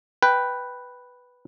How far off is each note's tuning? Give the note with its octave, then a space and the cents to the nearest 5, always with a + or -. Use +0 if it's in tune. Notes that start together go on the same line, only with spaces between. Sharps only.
B4 +0 G5 +0